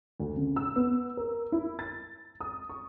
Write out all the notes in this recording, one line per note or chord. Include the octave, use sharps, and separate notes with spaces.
D2
C#3
E6
B3
A#4
E4
A6
D#6
C#6